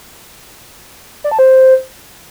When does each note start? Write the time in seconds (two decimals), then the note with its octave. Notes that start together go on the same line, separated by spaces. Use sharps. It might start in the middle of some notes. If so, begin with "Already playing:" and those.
1.24 D5
1.31 A5
1.39 C5